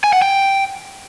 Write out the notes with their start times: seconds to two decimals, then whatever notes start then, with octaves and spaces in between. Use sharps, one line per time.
0.04 G#5
0.13 F#5
0.22 G5